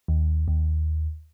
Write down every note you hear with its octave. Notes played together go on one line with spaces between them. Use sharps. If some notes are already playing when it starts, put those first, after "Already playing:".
D#2
D#2